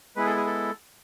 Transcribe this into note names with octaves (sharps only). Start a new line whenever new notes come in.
G#3 B3 E4 G#4 B4
A4
G#4
A4